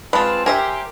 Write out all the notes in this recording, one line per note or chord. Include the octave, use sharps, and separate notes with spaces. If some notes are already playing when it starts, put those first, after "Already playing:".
G#3 C4 F4 B4 A5
G4 A#4 C5 E5 G#5